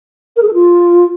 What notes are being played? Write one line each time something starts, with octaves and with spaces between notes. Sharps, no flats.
A#4
G#4
A4
F4